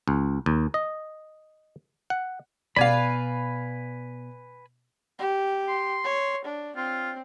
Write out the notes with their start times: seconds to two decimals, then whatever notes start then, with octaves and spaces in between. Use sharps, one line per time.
0.08 C#2
0.46 D#2
0.74 D#5
2.10 F#5
2.76 B2 B4 D5 F5 G#5 B5
5.19 G4
5.69 C6
6.04 C#5
6.45 D4
6.76 C4 F4